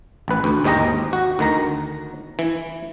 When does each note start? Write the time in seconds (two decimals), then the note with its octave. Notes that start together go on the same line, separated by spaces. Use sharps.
0.28 A1 B4
0.44 D2
0.64 D#2 G#2 G#3 G4 D#5 A#5
1.13 F#4
1.39 D2 D#3 A#5
2.39 E3